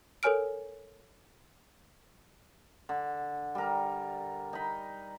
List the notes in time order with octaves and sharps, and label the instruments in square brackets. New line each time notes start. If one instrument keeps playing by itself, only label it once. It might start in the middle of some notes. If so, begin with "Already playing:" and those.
[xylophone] A4 A#4 C#5 G#5 F6 D7
[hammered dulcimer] D3
G3 A#4
D#4 B5